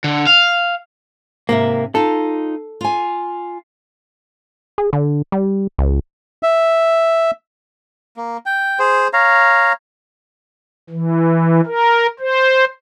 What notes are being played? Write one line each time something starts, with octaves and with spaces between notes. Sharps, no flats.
D3
F5
G#2 C3 A#3 E5
D#4 F4 A4
F4 G#5
G#4
D3
G3
C#2
E5
A#3
G5
G#4 C5
C#5 F5 A#5
E3
A#4
C5